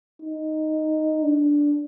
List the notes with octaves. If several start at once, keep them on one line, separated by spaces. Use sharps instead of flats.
D#4
D4